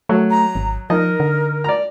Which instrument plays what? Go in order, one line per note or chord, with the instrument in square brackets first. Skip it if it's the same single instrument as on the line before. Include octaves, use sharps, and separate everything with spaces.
[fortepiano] F#3 [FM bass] A3
[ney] A#5
[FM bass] G#1
[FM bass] F3 [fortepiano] D#4 D#5 [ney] A#4
[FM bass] D3
[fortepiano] D5 A#5